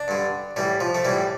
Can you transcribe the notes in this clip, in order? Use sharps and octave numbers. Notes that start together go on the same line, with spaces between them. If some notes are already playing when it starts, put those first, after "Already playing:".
Already playing: D4
G2 D3
A2 E3 G3
F3
A3
A2 E3 G3